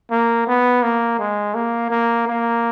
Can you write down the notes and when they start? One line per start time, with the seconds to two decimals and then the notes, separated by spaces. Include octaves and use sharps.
0.10 A#3
0.47 B3
0.83 A#3
1.19 G#3
1.55 A#3
1.90 A#3
2.27 A#3